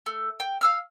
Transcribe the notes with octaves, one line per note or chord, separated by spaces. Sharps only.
A3
G5
F5 E6 F6